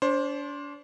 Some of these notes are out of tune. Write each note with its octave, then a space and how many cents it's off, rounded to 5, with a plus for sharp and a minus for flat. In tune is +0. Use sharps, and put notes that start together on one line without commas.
D4 -35 C5 +15